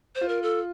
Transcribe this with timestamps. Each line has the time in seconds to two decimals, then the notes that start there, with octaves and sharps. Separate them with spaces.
0.15 C5
0.21 F4
0.29 A#4
0.43 A4